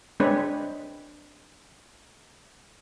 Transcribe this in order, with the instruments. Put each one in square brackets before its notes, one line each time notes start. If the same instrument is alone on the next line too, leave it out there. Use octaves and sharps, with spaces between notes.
[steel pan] G#3 C4 D4 B4 C#5